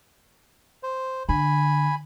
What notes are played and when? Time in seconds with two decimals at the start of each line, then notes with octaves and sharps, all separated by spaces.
0.83 C5
1.29 D3 G#5 B5